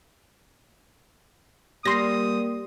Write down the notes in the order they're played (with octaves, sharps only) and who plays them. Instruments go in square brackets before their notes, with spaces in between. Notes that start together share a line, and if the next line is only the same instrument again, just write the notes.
[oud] G3 [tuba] A#3 [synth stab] C6 A#6 [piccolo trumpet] D#6